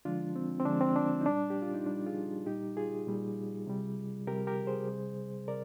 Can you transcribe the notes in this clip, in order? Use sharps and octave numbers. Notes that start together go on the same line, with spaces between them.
D3 F3 G#3 D4 F4
C4
C4
D3 F3 G#3 D4
C4
D4
D#4
A#2 G3 D4
G4
F4
D#4
A#2 G3 D4
F4 G#4
A#2 G3 D#4 G4
F4 G#4
A#2 G3
C3 G3
C3 G3 G4 A#4
G4 A#4
G#4 C5
C3 G3
C3 A#4 D5